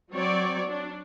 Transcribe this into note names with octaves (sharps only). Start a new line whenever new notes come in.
F#3 C4 C#5 D5
D4